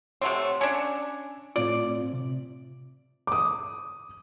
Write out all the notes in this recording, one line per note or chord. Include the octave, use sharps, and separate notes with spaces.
C3 A3 C4 C#5 F#5
C#4 D4 G#5
A2 C4 F4 D5
C3
D6 D#6